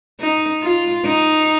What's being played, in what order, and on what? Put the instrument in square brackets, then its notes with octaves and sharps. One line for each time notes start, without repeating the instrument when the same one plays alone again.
[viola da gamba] D#4
F4
D#4